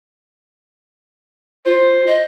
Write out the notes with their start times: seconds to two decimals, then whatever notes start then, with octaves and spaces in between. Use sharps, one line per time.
1.66 F4 C5
2.06 D#5